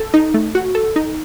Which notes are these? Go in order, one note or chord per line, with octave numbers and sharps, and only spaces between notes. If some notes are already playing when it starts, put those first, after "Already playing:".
Already playing: A4
D#4
A3
F#4
A4
D#4